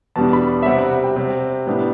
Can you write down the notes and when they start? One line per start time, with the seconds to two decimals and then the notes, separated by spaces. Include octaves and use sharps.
0.16 E2 B2 G3 D4 A5
0.33 B5
0.63 E5
0.66 C3 G3 C4 F#5
0.79 F#5
1.04 G5
1.16 C3 G3 C4
1.66 A2 G3 B3 D4